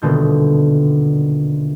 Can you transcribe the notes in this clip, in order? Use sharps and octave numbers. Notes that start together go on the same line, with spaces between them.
D#1 B2 D3 G6